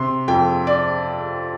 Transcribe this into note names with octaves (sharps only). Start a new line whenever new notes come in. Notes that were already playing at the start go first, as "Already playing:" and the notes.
Already playing: C3 C6
F2 G5
D5